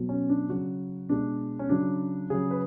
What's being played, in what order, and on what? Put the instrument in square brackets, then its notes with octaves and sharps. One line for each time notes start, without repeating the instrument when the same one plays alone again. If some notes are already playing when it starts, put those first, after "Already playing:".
Already playing: [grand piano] B2 F#3
C#4
D4
C#3 F#3 F#4
B2 G#3 D4
C#4
C#3 F#3 D4
C#3 F#3 G#4
B4